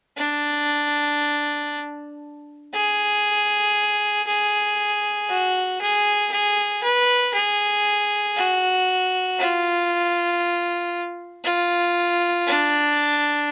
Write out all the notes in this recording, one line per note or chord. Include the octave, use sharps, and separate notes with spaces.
D4
G#4
G#4
F#4
G#4
G#4
B4
G#4
F#4
F4
F4
D4